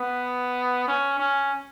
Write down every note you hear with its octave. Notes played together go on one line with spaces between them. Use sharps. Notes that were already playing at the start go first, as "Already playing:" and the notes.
Already playing: B3
C#4
C#4